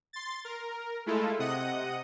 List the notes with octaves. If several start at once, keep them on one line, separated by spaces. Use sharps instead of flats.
C6 A6
A#4
G#3 A3 E4 F4 A4
C3 D#5 F#5 D#6